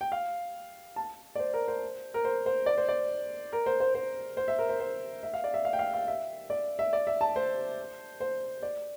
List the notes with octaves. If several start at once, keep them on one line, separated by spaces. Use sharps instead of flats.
G5
F5
A5
D5
C5
A#4
C5
A#4
C5
C5
D5
C5
D5
A#4
C5
C5
C5
C5
E5
A#4
C5
C5
E5
F5
D5
E5
F5
G5
F5
F5
E5
D5
E5
D5
E5
A5
C5
C5
D5